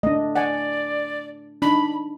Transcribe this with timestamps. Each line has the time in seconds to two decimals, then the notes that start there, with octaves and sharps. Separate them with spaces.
0.03 A3 D4 D#5
0.35 D5 F#5 G#5
1.62 D4 D#4 B5